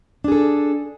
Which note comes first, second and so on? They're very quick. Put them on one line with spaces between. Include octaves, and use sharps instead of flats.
D4 G#4 A4